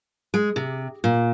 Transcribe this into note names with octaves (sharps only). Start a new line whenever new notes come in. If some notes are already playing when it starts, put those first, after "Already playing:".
G#3
C3
A#2